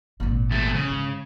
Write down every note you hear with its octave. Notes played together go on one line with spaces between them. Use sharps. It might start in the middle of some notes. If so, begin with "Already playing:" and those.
G#1 A#2
E2 A3
C#3
G#2